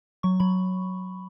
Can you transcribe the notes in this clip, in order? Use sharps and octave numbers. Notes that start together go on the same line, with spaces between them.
F#3 C#6
F#3 B5